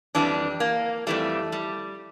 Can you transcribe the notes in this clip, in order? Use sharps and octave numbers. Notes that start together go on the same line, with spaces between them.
F2 E3 G3 D4
A#3
F2 E3 G3 A3
G3